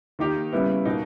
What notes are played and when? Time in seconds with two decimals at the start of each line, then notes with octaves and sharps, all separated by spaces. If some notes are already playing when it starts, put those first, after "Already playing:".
0.19 D#3 A#3 D#4 G4
0.52 C#3 G3 B3 E4
0.85 B2 A#3 D#4